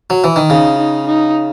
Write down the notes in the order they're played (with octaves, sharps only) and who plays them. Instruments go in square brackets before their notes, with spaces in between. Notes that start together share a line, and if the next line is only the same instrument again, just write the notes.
[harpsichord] F#3
E3
D#3
[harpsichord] C#3 [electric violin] D#4
[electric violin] D#4
D#4